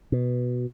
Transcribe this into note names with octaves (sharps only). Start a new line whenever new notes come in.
B2